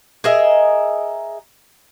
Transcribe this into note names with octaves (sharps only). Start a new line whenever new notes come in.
G#4 A#4 D#5 E5